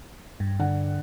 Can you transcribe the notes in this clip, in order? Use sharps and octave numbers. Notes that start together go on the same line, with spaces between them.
G2
D3 F#5